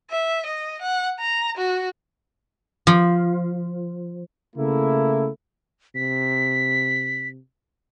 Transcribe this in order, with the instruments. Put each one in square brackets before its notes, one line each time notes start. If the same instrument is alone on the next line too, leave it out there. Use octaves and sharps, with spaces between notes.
[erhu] E5
D#5
F#5
A#5
F#4
[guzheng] F3
[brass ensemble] C#3 A3 A#3 E4
[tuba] C3 [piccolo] B6